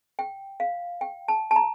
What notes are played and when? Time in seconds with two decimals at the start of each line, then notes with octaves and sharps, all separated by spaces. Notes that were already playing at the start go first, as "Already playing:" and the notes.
0.19 G5
0.60 F5
1.01 G5
1.28 A5
1.51 A5
1.56 A#5